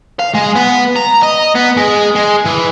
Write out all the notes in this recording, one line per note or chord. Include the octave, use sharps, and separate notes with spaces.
F5
G#3
B3
A#5
D#5
B3
G#3
G#3
E3